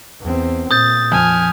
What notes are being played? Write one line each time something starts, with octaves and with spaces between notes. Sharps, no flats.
E2 C4
A#2 D#6 G6 A6
F2 G#5 F6